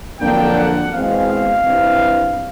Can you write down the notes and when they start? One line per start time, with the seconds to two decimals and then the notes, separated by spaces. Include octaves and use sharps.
0.20 F2 D3 F#3 A#3 D4 G5
0.56 F#5
0.93 E2 B2 G#3 C4 F5
1.64 G2 E3 G3 C4